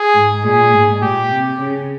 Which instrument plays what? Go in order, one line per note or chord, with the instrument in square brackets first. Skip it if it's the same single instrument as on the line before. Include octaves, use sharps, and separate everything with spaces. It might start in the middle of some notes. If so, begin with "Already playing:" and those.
Already playing: [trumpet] G#4
[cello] G#2
[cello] A#2 [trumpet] G#4
[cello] G#2
[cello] A#2 [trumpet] G4
[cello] C3
C#3